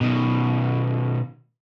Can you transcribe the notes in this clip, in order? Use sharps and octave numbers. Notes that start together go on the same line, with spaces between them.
B2 D#3